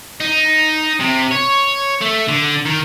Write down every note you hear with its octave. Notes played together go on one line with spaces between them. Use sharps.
D#4
C3
C#5
A3
D3
D#3